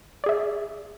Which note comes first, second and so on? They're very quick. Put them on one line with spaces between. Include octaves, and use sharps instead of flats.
D5 G#4 E5